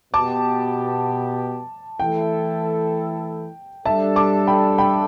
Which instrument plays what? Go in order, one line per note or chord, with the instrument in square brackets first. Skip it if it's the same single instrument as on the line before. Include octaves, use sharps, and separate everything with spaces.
[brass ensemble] B2 B3 G4 [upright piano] A5 D6
[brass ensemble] E3 A3 E4 A4 [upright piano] G5
[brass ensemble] G3 D4 A4 [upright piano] E5 A5
[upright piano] A5 D6
G5 B5
G5 B5